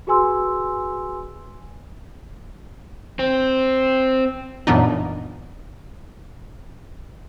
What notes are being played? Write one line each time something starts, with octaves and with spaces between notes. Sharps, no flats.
F#4 G#4 B4 G#5 C6 E6
C4
F#2 A#2 E3 B3 D4 D#4